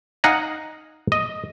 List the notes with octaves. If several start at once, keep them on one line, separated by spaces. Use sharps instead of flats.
D#4 F5 F#5 G#5 A#5
D#5